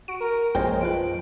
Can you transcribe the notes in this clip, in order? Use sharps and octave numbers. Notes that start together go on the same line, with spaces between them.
F#4 D7
A#4
A#1 F#2 G#3 A#4 C5 C#5 G5
F3 F4 B4 D7